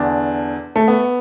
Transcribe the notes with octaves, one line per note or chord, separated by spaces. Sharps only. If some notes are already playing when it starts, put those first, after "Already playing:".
Already playing: E2 D3 D4
A3
B3